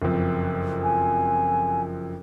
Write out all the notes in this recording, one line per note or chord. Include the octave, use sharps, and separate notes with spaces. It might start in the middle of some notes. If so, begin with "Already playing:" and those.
F#1 F2
G#5